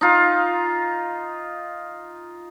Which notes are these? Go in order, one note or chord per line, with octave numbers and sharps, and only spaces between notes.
D#4 F4